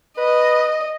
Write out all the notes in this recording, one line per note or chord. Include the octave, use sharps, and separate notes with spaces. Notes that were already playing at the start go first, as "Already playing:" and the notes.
B4 D#5